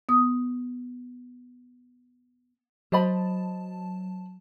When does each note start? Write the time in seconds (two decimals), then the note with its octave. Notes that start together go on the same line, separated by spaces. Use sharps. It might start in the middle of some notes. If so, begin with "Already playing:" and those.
0.09 B3 D#6
2.92 F#3 C5 D#5 A5 B5